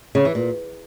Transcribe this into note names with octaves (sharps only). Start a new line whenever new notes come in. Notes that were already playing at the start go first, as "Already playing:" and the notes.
C#3
E3
A#2